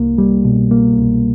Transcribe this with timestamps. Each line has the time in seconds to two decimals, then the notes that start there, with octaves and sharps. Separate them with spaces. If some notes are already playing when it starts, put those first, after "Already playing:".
Already playing: C2 A#3
0.18 G3
0.45 B2
0.71 A#3
0.97 C2